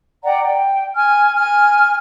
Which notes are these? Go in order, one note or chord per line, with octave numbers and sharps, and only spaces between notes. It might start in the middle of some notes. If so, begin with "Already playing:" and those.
D5 F#5 G5 A#5
G5
G#5 F6
G#5 F6